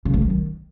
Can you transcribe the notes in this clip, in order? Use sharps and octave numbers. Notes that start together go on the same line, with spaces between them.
C#3
A3
F#3
D#3